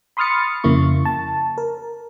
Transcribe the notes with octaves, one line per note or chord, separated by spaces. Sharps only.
B5 C6 D#6 F6 A6 C#7
F2 C#3 A#3 E4 C#6
A5
A#4